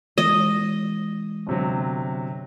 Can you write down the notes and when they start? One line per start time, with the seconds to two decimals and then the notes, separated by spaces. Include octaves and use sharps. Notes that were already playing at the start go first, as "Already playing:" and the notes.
0.18 E3 G#3 D#5
1.47 G1 C3 F#3